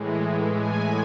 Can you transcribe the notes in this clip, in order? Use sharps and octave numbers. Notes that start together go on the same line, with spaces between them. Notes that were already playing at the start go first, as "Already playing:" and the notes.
Already playing: A2 E3 G#3
G#5